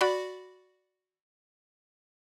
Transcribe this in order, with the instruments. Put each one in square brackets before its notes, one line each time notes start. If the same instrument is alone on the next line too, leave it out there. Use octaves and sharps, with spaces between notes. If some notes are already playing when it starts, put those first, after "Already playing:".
[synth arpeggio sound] F#4 D5 B5